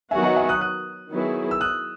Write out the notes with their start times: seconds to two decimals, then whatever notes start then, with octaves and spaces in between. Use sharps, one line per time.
0.11 D#3 F#3 B3 F#4 E5 G#5
0.24 D#5 F#5
0.36 E5 G#5
0.49 D#6 F#6
0.61 D#6 F#6
1.11 D#3 F#3 B3 E4 G#4
1.51 E6
1.61 D#6 F#6